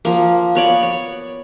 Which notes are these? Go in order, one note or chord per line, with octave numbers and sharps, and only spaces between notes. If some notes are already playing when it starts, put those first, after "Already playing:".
F3 A#3
B3 C#5 D5
C#5